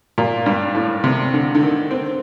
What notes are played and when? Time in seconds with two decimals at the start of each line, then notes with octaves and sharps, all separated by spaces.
0.18 A#2
0.46 G2
0.75 A2
1.04 C3
1.34 D3
1.55 D3
1.63 D#3
1.91 C4